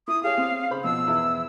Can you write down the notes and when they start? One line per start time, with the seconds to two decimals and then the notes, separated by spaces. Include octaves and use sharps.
0.08 E4 D#6
0.23 G4 G#4 C#5 F5
0.38 C4
0.70 C#3 C5 B5
0.84 B2 F3 E6
1.07 E2 E4 B4